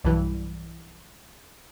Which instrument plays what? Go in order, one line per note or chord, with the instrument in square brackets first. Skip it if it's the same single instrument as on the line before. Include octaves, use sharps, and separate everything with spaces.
[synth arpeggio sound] B1 G2 E3